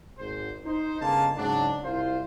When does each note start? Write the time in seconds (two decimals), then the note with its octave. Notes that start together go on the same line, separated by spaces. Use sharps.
0.18 G#1 G#2 C5
0.64 D#4 C5
1.01 G1 C#3 G#3 A#3 F5 A5
1.36 G#2 C#3 F#3 D4
1.83 C2 E4 F4 C5